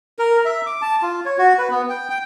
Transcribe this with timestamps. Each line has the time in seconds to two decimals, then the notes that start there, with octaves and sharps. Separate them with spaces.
0.19 A#4
0.45 E5
0.66 D6
0.82 A5
1.02 F4
1.25 C#5
1.38 F#4
1.58 B4
1.70 B3
1.89 G5
2.10 G5